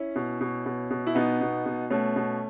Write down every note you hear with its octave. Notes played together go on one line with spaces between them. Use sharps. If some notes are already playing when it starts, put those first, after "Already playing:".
Already playing: C#4 E4
B2
B2
B2
B2
E4
B2 B3 D#4
B2
B2
B2 A3 C#4
B2